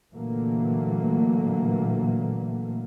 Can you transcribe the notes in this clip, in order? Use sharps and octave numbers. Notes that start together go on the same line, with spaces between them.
A#2 D3 E3 F#3 A3 A#3